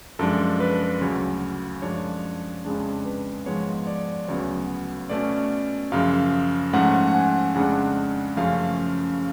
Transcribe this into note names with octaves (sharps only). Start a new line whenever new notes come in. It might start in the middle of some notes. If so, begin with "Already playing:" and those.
F#2 F3 G#3 D4 A4
B4
A4
B4
D2 C#3 F#3 C#5
F#2 F3 G#3 D4 C#5
F2 C#3 G#3 D4
B4
G#2 F3 G#3 B3 C#5
D5
D2 C#3 F#3 B3 C#5
B2 A3 C#4 D5
F#2 C#3 F3 F5
G#2 F3 A3 C#4 F#5
F#5
G#5
F2 C#3 G#3 D4 F#5
F#2 C#3 F3 A3 C#4 F5